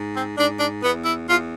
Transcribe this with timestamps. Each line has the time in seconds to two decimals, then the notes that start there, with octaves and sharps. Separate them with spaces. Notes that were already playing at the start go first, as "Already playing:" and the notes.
Already playing: G#2
0.15 C4
0.37 G#2 D4
0.60 D4
0.83 E2 B3
1.05 E4
1.27 E2 F4